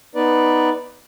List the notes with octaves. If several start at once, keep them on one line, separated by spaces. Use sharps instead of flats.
B3 D#4 B4 D5